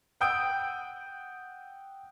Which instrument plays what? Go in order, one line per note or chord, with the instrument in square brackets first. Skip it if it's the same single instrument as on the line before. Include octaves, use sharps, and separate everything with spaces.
[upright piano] F#5 G5 D#6 E6 G6 D7